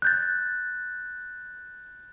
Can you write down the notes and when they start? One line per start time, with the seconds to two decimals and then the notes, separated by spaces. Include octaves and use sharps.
0.02 F#6 G6 A6